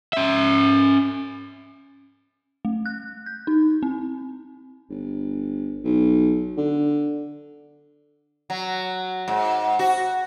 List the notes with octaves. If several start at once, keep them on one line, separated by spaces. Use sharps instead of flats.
C#4 E5
A3
F#6
G6
D#4
C4
G1
B1
D3
F#3
G#2
F#4